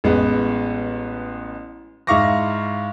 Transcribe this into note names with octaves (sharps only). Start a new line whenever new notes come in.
A1 G#3 B3
G#2 E4 F5 C#6 D6 A#6